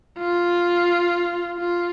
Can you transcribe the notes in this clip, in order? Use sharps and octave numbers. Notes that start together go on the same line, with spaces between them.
F4
F4